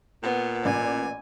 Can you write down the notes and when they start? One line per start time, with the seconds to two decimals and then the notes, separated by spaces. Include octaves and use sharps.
0.23 A#2 B3
0.65 A1 D5 G#5